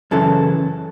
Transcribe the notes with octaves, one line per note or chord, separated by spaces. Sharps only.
F#2 C#3 E3 A4